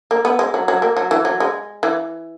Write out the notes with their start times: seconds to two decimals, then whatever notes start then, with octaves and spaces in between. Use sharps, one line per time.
0.11 A#3
0.25 B3
0.39 G#3
0.54 F#3
0.68 F#3
0.82 A#3
0.97 F#3
1.11 E3
1.25 F#3
1.40 G#3
1.83 E3